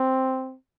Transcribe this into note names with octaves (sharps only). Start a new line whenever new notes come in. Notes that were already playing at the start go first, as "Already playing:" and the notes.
Already playing: C4